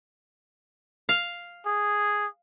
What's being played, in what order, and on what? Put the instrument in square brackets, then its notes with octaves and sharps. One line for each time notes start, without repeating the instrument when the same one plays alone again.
[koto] F5
[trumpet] G#4